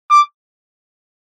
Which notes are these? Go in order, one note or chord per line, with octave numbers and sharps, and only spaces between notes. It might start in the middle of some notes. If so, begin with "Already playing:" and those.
D6